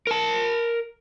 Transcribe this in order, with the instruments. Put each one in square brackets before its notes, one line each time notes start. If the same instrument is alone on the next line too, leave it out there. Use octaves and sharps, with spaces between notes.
[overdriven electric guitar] A#4 A5